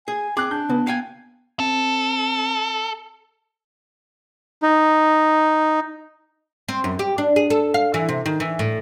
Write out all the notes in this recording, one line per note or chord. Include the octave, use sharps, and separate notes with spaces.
G#4 G#5
C4 G#4 D6 F#6
D4 G6
C#3 B3
F5 G5 G#5
C4 A4
D#4
C4
F#2
G4
D4
G#4
A4
F5
E3
C3
D#3
E3
A2